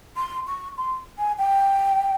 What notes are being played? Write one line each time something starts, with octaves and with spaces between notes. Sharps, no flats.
C6
C#6
C6
G#5
G5